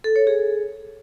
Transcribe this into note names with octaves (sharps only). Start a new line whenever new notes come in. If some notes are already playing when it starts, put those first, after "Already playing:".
A4
C#5
G#4